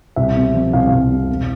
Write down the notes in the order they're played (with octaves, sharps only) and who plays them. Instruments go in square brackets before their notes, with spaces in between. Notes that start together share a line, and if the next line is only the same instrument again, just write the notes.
[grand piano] C2 E5
C3
F3
C2 F5
C2
C3
E1